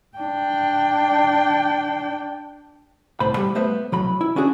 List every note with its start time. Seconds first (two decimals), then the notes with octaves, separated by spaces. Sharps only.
0.18 D4 G5
3.20 C2 A2 C5 B5
3.37 G3 G4
3.55 A3 B3 C5 E5
3.92 C2 F#3 B5
4.21 E4
4.36 C#4 D4 F#4 G#4